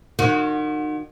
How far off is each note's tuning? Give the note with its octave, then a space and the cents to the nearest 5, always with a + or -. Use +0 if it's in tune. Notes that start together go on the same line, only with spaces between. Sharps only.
D#3 -35 F#4 -25